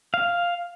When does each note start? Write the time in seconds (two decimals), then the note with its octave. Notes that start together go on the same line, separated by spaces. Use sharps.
0.14 F5